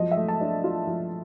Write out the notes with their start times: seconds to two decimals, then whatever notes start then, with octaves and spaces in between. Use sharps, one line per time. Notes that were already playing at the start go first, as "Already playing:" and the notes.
Already playing: F3 F#3 D#5
0.11 E5
0.17 A3
0.28 A5
0.41 D4
0.64 F4
0.87 F3